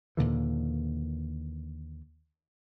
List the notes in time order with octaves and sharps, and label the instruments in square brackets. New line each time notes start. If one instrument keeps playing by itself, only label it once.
[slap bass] D#2 A#2 D3 E3